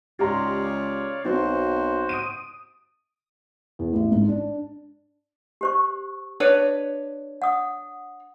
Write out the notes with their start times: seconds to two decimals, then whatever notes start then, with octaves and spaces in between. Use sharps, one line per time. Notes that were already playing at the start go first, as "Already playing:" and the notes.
0.19 C#2 G4 C#5 D5 F5 A#5 C6
1.25 B1 F#3 C4 F#4 C5
2.09 D#6 D7 D#7
3.79 E2
3.93 A1
4.11 G#2
4.28 D4
5.61 G4 C5 C#6
6.40 D4 B4 C#5
7.42 F#5 D#6